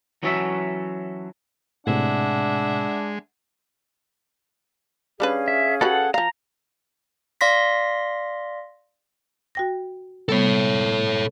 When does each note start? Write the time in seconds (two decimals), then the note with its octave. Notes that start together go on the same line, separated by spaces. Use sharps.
0.23 E3 F#3 C#4 F#4 A4 E5
1.87 A2 C3 G#3 D4 E5 F#5
5.20 G3 C#4 D4 G#4 B4 F5
5.48 E5
5.81 F#4 G4 A4 B4 F#5
6.14 F3 F5 A#5
7.41 D5 F5 C6 A#6 B6
9.55 F#4 G5 A#6
10.29 C3 G3 B3 A4 C#5